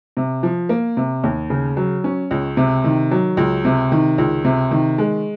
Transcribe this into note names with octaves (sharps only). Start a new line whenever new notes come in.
C3
F3
A#3
C3
D#2
C#3
F#3
C#4
C#2
C3
D#3
F#3
C#2
C3
D#3
C#2
C3
D#3
G#3